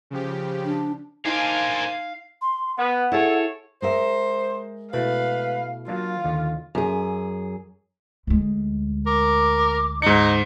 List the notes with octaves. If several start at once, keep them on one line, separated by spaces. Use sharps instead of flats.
C#3 F3 G4
D4
A#3 D4 D#4 C5 D#5 F5 G#5 C6
C6
B3 F#5
E4 G#4 A4 C#5
G#3 A#4 C5 E5
B2 A3 E4 B4 F5
F#3 A#3 D4 F4 F5
D#2 D3
F#2 G#4
D2 G#3
A#4 D6
G#2 D#4 C#7